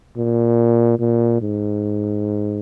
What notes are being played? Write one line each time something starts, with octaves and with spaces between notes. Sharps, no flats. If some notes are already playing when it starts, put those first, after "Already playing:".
A#2
A#2
G#2